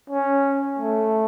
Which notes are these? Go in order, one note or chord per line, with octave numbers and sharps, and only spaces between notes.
C#4
A3